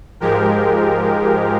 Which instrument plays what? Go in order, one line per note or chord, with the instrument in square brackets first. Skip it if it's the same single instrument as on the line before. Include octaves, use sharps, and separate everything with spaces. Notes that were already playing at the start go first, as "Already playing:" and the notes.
[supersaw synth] G#2 F3 G#3 G4 A#4